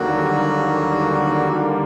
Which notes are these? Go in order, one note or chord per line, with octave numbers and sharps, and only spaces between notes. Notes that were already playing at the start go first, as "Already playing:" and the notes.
Already playing: D#2 D3 F#3 G3 A#3 F#4